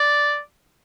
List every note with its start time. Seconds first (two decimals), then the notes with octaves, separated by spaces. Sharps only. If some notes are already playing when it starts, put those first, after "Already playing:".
Already playing: D5